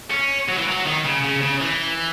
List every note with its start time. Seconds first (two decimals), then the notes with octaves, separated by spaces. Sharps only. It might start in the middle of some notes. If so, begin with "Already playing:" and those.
0.11 C#4
0.48 F#3
0.57 E3
0.67 F#3
0.86 D#3
1.05 C#3
1.24 C#3
1.42 C#3
1.61 E3